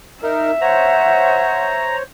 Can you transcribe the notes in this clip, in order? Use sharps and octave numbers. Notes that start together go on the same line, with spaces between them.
D#4 A#4 E5
C5 C#5 F#5 A#5